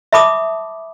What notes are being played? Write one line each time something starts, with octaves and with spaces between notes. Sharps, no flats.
E5 A5 B5 D6 D#6